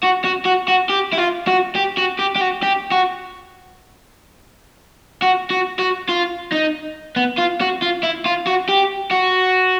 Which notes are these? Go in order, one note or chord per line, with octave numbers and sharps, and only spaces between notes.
F#4
F#4
F#4
F#4
G4
E4
F4
F#4
G4
F#4
G4
G4
F#4
G4
F#4
F#4
F#4
F#4
F4
D#4
B3
F4
F#4
F4
E4
F4
F#4
G4
F#4